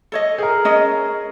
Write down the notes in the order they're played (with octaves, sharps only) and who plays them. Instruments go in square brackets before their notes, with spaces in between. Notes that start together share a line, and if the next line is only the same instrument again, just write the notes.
[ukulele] A4 C#5 D#5
[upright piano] G#4 A#4
[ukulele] C#4 D#5